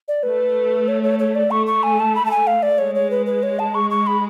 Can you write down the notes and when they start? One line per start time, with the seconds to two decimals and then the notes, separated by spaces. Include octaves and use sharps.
0.08 D5
0.23 A3 B4
0.88 C#5
1.03 C#5
1.19 C#5
1.35 D5
1.51 A3 C#6
1.67 C#6
1.83 G#5
2.00 A5
2.15 B5
2.26 A5
2.31 G#5
2.47 F5
2.63 D5
2.78 G#3 C#5
2.95 C#5
3.11 B4
3.26 B4
3.43 C#5
3.59 A5
3.75 C#6
3.90 C#6
4.07 B5